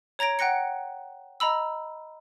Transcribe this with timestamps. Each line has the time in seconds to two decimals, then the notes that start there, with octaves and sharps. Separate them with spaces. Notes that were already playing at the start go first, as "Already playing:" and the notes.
0.19 C#5 A#5 G#6 A#6 D7
0.39 F#5 G5 F#6 A#6 C#7
1.40 D#5 A#5 B5 E6